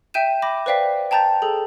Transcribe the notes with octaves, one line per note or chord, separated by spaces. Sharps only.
E5 G5 G6 D#7 E7
B5 D6 A#6
B4 C5 D5 F5 G5 B6
G5 A5 A#5 G6 A6
G#4 A4